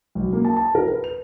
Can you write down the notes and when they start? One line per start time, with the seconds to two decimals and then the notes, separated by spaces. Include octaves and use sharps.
0.15 B1
0.33 A#3
0.45 A5
0.57 A5
0.75 A#4
0.87 B4
1.04 F7